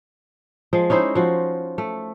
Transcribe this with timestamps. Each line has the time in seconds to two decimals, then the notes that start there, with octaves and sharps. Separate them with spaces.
0.73 F3 G#3
0.90 C#4 D#4 E4 C5
1.15 F3 F#4
1.78 A3